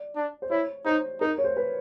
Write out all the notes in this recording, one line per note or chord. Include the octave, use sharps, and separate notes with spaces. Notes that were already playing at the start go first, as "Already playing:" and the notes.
Already playing: D5
D4
C5
E4 C#5
D#4 C5
D#4 A#4
C#5
C5
B4